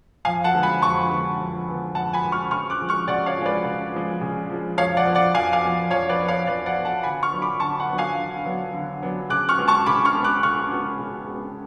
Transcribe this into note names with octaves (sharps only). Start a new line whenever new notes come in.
F2 F5 G#5
F#5 A5
D3 G#3 B3
G#5 B5
F2 A5 C#6
D3 G#3 B3
F2
D3 G#3 B3
F2 F#5 A5
G#5 B5
D3 G#3 B3
C#6 F6
C#3 C#6 F6
D6 F#6
F3 G#3
C#6 F6
C#3 D5 F#5
C#5 F5
F3
G#3 B4 D5
C#3
F3 G#3
C#3
F3 G#3
F2 C#5 F5
D5 F#5
F3 B3
D5 F#5
F2 F5 G#5
F5 G#5
F3 B3
F2 C#5 F5
B4 D5
F3 B3
C#5 F5
F2 B4 D5
D5 F#5
F3 B3
F#5 A5
D3 G#5 B5
C#6 F6
F#3 B3 D4
B5 D6
D3 A5 C#6
F#5 A5
F#3 B3 D4
F5 G#5
D3
F#3 B3 D4
D3
F#3 B3 D4
C#3 D6 F#6
C#6 F6
G#3 B3
A5 C#6
C#3 B5 D6
C#6 F6
G#3 B3
D6 F#6
C#3 C#6 F6
G#3 B3
C#3
G#3 B3